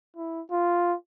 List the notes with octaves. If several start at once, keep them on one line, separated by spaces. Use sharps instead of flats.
E4
F4